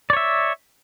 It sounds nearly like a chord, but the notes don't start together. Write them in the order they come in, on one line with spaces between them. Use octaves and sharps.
D5 C#5 E5